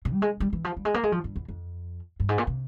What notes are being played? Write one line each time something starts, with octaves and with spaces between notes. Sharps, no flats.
C3
G3
G#3
G3
E3
F3
G3
G#3
A#3
G#3
F3
G2
E2
F2
G2
G#2
A#2
C3